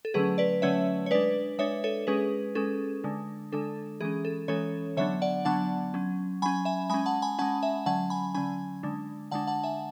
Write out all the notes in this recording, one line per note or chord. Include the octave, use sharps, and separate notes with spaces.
A4
D3 F#3 A3 C#4 G#4 B4
B4 D5
D3 F#3 A3 C#4 C#5 E5
C#5
G#3 D4 B4 D5
G#3 D4 C#5 E5
A4 C#5
G#3 C#4 G#4 B4
G#3 C#4 A4
D3 G#3 D4
D3 G#3 D4 A4
E3 G#3 C#4 G#4
A4
E3 G#3 C#4 A4 C#5
D3 F#3 B3 D4 C#5 E5
D5 F#5
D3 F#3 B3 D4 F#5 A5
F#3 C#4
F#3 C#4 G#5 B5
E5 G#5
G#3 C#4 G#5 B5
F#5 A5
G#5 B5
G#3 C#4 F#5 A5
E5 G#5
D3 F#3 C#4 F#5 A5
G#5 B5
D3 F#3 C#4 G#5 B5
D3 G#3 D4
D3 G#3 D4 F#5 A5
F#5 A5
E5 G#5